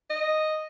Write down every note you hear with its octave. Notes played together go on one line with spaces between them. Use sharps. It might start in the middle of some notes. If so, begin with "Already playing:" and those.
D#5